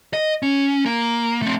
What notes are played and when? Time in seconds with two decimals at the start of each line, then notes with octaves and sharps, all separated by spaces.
0.13 D#5
0.43 C#4
0.86 A#3
1.42 A3 C4